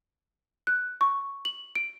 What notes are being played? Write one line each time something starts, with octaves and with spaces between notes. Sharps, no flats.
F#6
C#6
F#7
D7